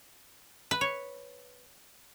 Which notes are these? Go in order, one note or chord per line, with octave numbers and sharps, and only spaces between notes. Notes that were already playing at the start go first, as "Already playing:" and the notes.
B4
C#5